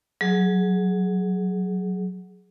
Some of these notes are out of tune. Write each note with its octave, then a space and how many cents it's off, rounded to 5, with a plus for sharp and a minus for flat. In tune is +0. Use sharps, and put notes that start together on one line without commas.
F#3 +0 G#4 +10